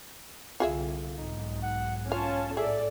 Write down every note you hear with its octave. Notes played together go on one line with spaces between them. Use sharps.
C2 D3 F4 G#4 E5
B1 G#2 D#4
F#5
C#4 F4 F5 A5
A2 G#4 A4 D5 E5